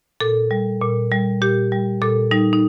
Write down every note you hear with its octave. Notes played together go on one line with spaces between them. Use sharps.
A#2 A4
G3
A#2
G3
A#2 G4
G3
A#2 A4
G3 D#4
D#4